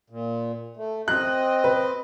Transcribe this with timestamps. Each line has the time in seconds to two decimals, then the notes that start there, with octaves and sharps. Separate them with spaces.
0.10 A#2
0.77 A3
1.08 C4 D#5 F#6
1.64 B4